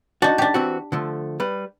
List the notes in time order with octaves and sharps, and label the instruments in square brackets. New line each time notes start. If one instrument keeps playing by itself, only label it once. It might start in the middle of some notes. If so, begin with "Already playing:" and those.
[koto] D4 D#4 [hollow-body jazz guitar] F#4
[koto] D4 G4
[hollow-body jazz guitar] E3 C4 F#4
D3 F3 A3
G3 B4